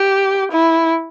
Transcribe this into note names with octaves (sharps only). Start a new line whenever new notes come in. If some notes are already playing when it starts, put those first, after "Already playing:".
Already playing: G4
E4